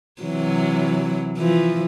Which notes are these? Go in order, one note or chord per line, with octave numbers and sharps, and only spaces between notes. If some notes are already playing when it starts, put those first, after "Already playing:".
C3 E3 F#3
E3 F3